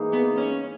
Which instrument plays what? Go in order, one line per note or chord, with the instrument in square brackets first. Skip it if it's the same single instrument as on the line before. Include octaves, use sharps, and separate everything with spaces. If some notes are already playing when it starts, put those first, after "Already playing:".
Already playing: [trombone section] G#2 E3 A#3 D#4 G#4
[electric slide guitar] B3
C#4